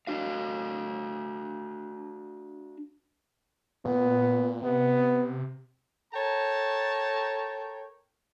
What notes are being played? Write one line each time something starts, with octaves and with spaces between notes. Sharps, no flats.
D4 F#4 F5
A#2 B3
C3 B3
A4 A#4 C#5 G5 A5 A#5